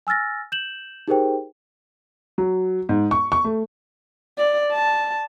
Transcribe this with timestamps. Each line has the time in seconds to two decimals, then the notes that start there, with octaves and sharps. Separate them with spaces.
0.07 G#5 E6 F6 A6 A#6
0.52 G6 E7 F#7
1.08 D#4 G4 G#4 A#4 C5 G5
2.38 F#3
2.89 G#2
3.11 C#6
3.32 C#6
3.44 A3
4.38 D5
4.72 A5